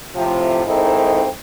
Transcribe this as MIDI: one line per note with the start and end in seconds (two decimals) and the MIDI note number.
0.15 0.65 45
0.15 0.65 48
0.15 0.65 53
0.66 1.26 44
0.66 1.26 51
0.66 1.26 60
0.66 1.26 63
0.66 1.26 64
0.66 1.26 69